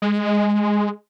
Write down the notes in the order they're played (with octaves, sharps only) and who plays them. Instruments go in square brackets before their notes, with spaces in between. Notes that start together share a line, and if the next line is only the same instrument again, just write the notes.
[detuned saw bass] G#3